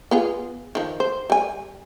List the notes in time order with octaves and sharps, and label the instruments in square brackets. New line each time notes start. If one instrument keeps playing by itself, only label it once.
[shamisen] B3 F4 G#4
D#3 F3
C5
G3 G#5